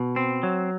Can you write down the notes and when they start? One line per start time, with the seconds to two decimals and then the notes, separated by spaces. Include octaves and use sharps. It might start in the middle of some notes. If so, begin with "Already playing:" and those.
Already playing: B2
0.16 C4
0.43 F#3